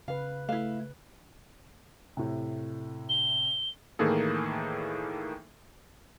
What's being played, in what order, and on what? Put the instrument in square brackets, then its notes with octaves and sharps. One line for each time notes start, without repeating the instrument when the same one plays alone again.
[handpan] C#3 B4 [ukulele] F5
[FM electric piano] A3 [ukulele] E4 F5
[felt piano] A2 C3
[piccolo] G7
[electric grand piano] A2 D#3 E3 A#3 G#4 A4